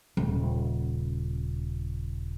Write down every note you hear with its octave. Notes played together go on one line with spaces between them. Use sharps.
D#1 C#3